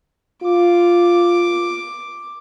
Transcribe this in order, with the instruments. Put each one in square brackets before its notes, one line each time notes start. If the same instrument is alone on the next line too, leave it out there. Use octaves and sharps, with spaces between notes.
[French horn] F4 [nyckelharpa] D6